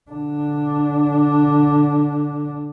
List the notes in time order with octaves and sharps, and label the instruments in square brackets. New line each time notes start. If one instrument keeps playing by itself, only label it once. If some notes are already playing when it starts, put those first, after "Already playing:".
[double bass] D3 D4